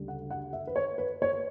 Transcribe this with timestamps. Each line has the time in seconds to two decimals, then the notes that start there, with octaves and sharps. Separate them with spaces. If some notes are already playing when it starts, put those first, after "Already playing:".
Already playing: D2 C#3 G3
0.08 F#5
0.30 F#5
0.53 E5
0.67 B4
0.76 C#5
0.98 B4
1.22 C#5